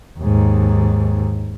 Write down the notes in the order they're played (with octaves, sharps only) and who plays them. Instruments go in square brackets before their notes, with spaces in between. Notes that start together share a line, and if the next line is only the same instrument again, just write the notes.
[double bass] D#2 G#2